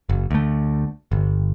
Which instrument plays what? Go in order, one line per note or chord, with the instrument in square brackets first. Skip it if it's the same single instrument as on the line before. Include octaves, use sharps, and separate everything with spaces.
[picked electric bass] F#1
D2 A3
G1